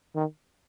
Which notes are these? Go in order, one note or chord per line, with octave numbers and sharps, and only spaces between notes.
D#3